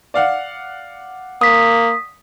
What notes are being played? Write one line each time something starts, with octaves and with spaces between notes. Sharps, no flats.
D5 F5 F#5
A#3 D#6 B6